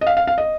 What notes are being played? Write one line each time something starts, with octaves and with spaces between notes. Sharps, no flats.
D#5
F5
F5
F5
D#5